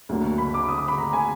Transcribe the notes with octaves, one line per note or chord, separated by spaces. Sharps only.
D2 D3 F#3 A#3
B5
D6
D#6
D6
B5
A#5
G#5